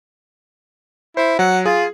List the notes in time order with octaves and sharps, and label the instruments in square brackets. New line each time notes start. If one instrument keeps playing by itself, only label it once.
[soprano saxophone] E4 [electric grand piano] C5
[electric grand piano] F#3 [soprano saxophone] F#5
[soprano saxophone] F4 [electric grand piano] G#4